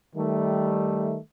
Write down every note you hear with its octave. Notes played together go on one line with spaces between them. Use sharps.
D#3 G3 A3